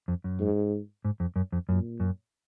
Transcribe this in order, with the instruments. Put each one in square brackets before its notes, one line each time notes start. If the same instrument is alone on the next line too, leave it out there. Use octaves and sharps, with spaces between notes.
[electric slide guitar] F2
F#2
[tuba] G#2
[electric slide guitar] G#2
F2
F#2
F2
[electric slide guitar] F#2 [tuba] A#2
[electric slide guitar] F#2